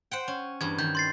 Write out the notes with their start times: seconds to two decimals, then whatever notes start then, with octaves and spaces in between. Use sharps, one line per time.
0.11 C5 F#5 G5
0.28 C#4
0.61 E2 G2 G#6
0.79 D#3 G6
0.95 C6 A6 C7